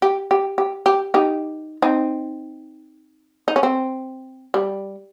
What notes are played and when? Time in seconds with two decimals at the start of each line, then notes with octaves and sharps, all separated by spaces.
0.02 G4
0.31 G4
0.58 G4
0.86 G4
1.14 D#4 G4
1.82 C4 D#4
3.48 D#4
3.56 C#4
3.63 C4
4.54 G3